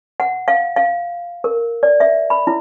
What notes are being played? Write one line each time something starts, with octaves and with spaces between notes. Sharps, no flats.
F#5
F5
F5
A#4
D5
E5
B5
E4